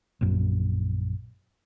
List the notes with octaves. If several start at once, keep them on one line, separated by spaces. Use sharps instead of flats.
A#1 F#2